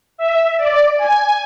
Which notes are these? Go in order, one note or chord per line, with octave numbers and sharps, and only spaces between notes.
E5
D5
G#5